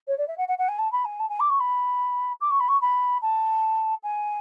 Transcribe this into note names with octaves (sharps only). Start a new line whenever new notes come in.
C#5
D5
E5
F#5
F#5
F#5
G#5
A5
B5
G#5
A5
G#5
D6
C#6
B5
D6
C#6
B5
C#6
B5
A5
G#5